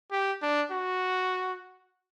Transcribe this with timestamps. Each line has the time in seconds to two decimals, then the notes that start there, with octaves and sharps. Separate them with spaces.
0.11 G4
0.42 D4
0.72 F#4